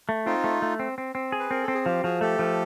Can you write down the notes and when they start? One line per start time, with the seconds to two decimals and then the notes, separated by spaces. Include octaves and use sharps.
0.09 A3
0.26 C4 D#4 F4
0.44 A3
0.62 A3
0.79 C4
0.98 C4
1.15 C4
1.32 G#4
1.40 B4
1.51 C4 A#4
1.62 A4
1.68 C4
1.74 G#4
1.86 F3 F4 G4
2.03 F3 F#4 G#4
2.21 A3 G4 A4
2.39 F3